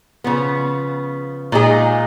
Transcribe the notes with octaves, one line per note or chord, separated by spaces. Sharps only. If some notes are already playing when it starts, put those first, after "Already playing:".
C#3 F3 B3
A#2 G#3 D#4 G#4